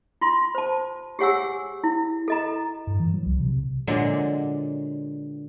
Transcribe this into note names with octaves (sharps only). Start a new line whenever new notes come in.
F4 C6
C5 A5
G4 G#4 C#5 F#5 G#5 E6
E4
A4 D#5 A#5
G2
E3
F#3
C2
C3
A#2 D3 F#3 G#3